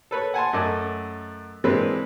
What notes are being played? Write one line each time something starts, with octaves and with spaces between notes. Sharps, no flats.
A4 B4 C#5
F#5 G#5 A5 C6
F#2 A3 D#5 D6
E3 G#3 A#3 C4 D4 B4